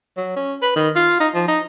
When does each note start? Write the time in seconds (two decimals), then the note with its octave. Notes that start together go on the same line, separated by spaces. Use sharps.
0.17 F#3
0.36 C#4
0.62 B4
0.76 D#3
0.96 F4
1.20 D#4
1.34 F3
1.48 D#4